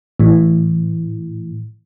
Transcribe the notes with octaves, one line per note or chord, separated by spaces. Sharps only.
A2 E3